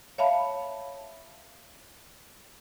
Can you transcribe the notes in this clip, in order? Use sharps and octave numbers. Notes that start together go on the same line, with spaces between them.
C#5 E5 F5 A5 B5